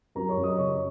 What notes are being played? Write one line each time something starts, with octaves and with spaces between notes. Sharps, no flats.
F#2 A#4 A#5
C#5 C#6
F#2
D#5 D#6
C#3 C#5 C#6